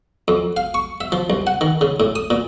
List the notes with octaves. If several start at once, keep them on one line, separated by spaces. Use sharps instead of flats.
F2
F5
C#6
E5
F3
C2
F#5
D#3
C#3
A2
D#6
A#2